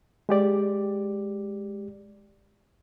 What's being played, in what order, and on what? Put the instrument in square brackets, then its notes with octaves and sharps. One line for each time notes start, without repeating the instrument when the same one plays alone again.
[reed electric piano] G#3 G4 D5